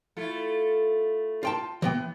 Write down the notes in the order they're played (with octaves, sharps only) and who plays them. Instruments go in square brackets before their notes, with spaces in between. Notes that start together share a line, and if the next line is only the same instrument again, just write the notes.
[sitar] A3 E4 F4
[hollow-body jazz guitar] F4 G5 A5
E3 B3 G5